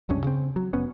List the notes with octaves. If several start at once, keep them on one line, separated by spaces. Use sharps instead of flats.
F1 C#2 G2 C#4
C#3 C4
F#3
F1 B3 C#4